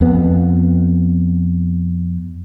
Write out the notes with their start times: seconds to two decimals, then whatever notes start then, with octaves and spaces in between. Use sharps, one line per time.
0.01 F2 B3